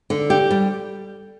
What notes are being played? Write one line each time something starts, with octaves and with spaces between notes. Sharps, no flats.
D3
G4
G3